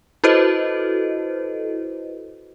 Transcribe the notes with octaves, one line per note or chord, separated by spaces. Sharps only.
E4 F#4 A4 B4 C5 D#5